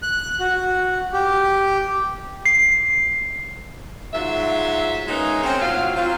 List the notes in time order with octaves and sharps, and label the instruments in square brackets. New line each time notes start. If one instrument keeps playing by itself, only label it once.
[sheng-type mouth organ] F#6
F#4
G4
[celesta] C7
[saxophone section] G#2 F#3 F4 E5
G#3 A#3 B3 C#4 D#4
C4 C#4
A2 C3 F#3 F4 F#4 F5
F#3 C4 F4